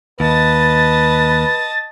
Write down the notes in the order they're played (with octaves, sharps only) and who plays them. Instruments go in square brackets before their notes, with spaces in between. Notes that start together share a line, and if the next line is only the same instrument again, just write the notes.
[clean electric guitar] D#2 [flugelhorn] B4 [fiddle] D#5 A5 [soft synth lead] A6